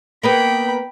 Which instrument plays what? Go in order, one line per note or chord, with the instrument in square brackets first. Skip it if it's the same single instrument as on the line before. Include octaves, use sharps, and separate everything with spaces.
[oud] A#3 B3 B4 [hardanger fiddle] G5 B5